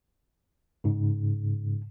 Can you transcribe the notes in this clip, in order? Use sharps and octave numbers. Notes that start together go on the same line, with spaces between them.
G#2 C#3